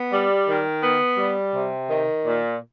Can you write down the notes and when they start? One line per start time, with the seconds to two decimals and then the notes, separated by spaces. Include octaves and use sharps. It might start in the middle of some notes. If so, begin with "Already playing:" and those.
Already playing: B3
0.12 G3
0.48 D#3
0.83 B3
1.18 G3
1.54 C3
1.89 D#3
2.25 A#2